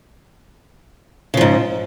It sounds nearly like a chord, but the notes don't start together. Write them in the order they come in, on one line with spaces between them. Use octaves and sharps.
C#3 F3 G#2